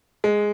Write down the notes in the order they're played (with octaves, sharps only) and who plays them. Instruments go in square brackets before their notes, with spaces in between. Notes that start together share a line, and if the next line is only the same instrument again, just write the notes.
[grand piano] G#3